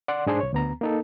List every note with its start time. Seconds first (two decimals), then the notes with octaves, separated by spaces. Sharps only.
0.08 D5 F#5 C6
0.26 G#2 D4 G#4 C5 C6
0.40 C2 C#5
0.53 D2 B3 A#5
0.81 A#3 D#4 A4